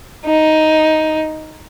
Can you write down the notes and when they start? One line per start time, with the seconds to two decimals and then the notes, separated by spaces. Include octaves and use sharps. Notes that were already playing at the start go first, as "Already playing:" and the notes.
0.25 D#4